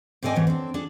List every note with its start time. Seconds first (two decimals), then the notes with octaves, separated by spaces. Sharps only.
0.23 G#2 C4 A4 D5 D#5 G#5
0.35 G#2 E3 F#3 C5 C#5
0.47 C4 D4 A4
0.74 D4 G#4 A4